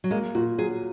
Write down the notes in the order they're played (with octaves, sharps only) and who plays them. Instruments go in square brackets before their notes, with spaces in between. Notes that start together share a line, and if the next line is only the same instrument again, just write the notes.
[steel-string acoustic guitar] F#3
[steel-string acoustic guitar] G#3 [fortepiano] A#3
[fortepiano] A#2 [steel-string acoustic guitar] F#4
[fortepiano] F#3 [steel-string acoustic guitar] G#4